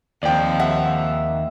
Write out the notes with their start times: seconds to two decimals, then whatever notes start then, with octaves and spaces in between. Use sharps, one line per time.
0.23 D#2 F3 C4 D5 G5
0.60 E5 F#5